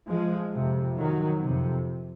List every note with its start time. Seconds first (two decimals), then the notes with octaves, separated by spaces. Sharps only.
0.08 F3 G#3
0.54 F2 C3
0.98 D#3 F#3
1.42 F2 C3